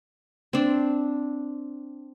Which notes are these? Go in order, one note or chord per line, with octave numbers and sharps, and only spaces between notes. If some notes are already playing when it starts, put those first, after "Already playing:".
C4 D4